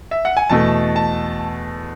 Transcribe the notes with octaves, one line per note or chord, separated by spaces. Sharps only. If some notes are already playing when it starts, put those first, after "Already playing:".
E5
F#5
G#5
E2 B2 A3 A5
A5